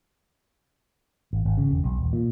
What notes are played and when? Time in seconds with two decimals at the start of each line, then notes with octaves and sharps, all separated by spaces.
1.33 G#1
1.45 G#1
1.58 C#3
1.71 E1
1.84 B1
1.98 D#1
2.13 A#2